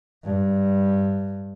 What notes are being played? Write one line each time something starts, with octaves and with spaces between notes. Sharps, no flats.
G2